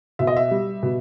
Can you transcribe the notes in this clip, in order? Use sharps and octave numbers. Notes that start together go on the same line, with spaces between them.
B2 E5
D#5
E5
G3
B2